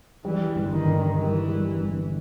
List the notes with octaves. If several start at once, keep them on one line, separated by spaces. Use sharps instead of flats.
E3 G3
G1
D#3
G2
E3 G3
G3
G1